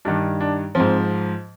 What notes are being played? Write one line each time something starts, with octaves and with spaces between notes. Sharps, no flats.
G2 D#3 D4
D4
G#2 F3 C4